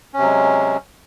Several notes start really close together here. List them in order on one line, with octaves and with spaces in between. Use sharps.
C#4 C3 F#3 G#3